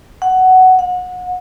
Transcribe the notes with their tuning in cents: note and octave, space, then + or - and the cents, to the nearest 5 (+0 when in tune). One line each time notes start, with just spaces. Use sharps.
F#5 +10
F#5 -30